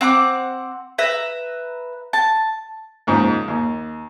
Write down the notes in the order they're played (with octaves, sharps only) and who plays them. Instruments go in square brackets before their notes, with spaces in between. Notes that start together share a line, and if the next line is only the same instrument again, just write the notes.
[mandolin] C4 F#5 B5 D6
B4 E5 A#5
A5
[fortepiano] D#2 G#2 C#3 F3
D#2